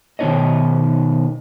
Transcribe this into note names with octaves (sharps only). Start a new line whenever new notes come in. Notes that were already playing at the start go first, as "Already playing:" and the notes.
B2 D#3 F3 D#4 C#5 D#5